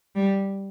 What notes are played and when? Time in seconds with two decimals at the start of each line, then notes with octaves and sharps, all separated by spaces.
0.16 G3